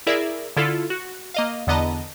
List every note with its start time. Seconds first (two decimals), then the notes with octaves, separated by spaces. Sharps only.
0.07 E4 G#4 A#4 D5 E5
0.57 D3 E4 F4 A4
0.90 F#4
1.34 A#3 D#5 F5
1.67 E2 D3 B3 D#5 A5 A#5